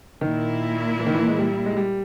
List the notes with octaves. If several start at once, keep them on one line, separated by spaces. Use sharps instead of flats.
A#2 D#3 A#3 E4
E3
D#3
E3
G#3
G3
G#3
G3